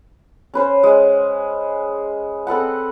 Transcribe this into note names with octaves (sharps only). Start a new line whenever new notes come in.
C#4 B4 C5
G#3
C4 A4 B4 F#5